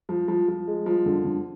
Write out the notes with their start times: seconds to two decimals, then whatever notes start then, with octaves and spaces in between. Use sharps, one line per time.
0.09 F3
0.28 F3
0.48 F3
0.67 G#3
0.86 F3
1.06 D3
1.25 D3